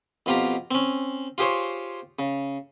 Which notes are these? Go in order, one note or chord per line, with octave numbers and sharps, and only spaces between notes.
F2 B2 F4 G4 A#5
C4 C#4
F4 G4 G#4 C5 C#5
C#3